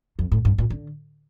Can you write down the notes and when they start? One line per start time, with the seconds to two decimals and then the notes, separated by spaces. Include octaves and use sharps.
0.19 F2
0.31 A2
0.45 G2
0.58 A#2
0.70 D3